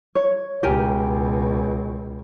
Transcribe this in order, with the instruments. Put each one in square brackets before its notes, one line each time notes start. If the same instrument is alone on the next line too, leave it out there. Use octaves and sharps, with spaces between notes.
[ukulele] C#5
[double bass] C#2 B2 [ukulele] G4 A#4 G#5